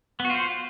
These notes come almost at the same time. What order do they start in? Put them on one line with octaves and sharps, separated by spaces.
B3 F#4 F4 C5